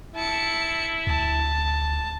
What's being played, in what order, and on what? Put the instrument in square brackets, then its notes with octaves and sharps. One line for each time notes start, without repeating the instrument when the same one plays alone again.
[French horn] E4 [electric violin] A5 C#7
[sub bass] D2 [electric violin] A5